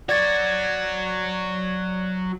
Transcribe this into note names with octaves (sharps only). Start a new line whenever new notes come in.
F#3 F#4 D5 G#6 A6